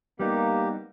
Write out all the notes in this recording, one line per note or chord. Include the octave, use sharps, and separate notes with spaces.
G3 A#3 B3 D#4 G4